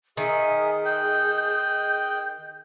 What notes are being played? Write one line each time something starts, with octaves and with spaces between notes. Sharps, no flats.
D#3 G#4 A#4 E5 G#5 D#6
D#5 G5 F#6 G6